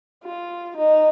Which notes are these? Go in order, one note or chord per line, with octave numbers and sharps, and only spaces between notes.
F4
D#4